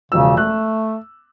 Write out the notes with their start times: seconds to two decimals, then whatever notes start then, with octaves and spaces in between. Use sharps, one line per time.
0.12 E1 C#3 F3 E6
0.37 A3 F#6